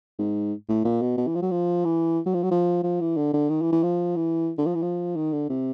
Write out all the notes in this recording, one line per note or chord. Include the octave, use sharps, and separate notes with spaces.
G#2
A2
A#2
B2
B2
E3
F3
F#3
F3
E3
F#3
F3
F#3
F3
F3
E3
D3
D3
D#3
E3
E3
F3
E3
D3
F3
E3
F3
D#3
D3
C3